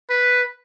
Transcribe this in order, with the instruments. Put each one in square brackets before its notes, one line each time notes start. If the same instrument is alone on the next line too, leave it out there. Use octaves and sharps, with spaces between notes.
[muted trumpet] B4